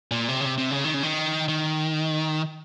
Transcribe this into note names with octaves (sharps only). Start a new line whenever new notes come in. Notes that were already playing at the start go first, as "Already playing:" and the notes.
A#2
C3
C#3
C3
C3
C#3
D#3
C#3
D#3
D#3